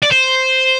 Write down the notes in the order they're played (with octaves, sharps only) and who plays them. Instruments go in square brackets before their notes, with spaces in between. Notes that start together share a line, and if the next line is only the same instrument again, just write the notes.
[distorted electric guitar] D5
C5